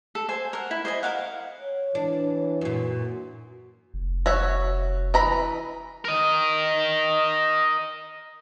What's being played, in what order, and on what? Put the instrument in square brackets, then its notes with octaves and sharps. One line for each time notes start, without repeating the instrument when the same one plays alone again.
[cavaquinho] A4
C5 G#5
A#4 F#5
E4
C5 D#5 G#5
A#4 F5 F#5
[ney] C#5
[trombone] E3 [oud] D4
[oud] F#2 A#2 [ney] F#4
[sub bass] F1
[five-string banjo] F#4 C#5 E5
E3 A#5 B5
[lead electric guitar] A#4 D#5